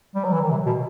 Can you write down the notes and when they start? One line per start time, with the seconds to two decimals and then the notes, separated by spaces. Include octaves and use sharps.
0.15 G3
0.24 F#3
0.32 E3
0.42 D#3
0.51 C3
0.66 B2